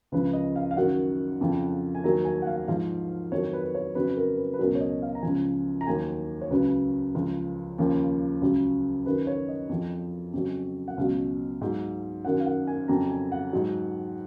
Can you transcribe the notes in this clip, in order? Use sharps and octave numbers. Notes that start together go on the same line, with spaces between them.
C#2 C#3 F3 B4
D#5
F5
F5
F#2 D#3 F#3 F#5
F2 C#3 F3
G#5
D#2 D#3 F#3 A#5
G#5
F#5
F5
G#2 F3 F5
F2 D#3 F#3 C#5
B4
B4
C#5
F2 C#3 F#3 B4
A#4
B4
B4
C#2 B2 F#3 A#4
C#5
D#5
F5
A#5
C#2 C#3 F3 G#5
A#5
D#2 D#3 F#3 G#5
C#5
C#2 C#3 F#3 B4
C#2 C#3 F3
D#2 C#3 F3
C#2 C#3 F#3
F#2 D#3 F#3 B4
C#5
D#5
F2 F3
F2 C#3 F#3
F#5
C#2 B2 F#3 F5
G#2 F#3
F#2 D#3 F#3 F#5
F5
F#5
G#5
F2 C#3 F#3 A#5
G#5
F#5
G#2 F#3